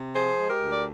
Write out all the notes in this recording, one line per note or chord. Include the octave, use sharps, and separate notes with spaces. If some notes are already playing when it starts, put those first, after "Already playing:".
Already playing: C3
F3 G#4 C5
G#3
G4 A#4
D2
D5